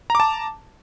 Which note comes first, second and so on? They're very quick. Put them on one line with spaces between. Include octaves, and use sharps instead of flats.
A#5 D6 A5